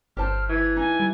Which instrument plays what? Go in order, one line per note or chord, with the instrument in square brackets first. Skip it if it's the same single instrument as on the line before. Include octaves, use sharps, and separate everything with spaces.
[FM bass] G1 [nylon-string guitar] G4 C5 A5 [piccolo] F6
[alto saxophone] E3 [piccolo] G#6
[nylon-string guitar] D#4 [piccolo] G#5
[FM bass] G3